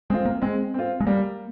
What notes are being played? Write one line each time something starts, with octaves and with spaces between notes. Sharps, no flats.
G#3 C4 F4
A#3
G#3 C4
C4 F4
G#3
G3 A#3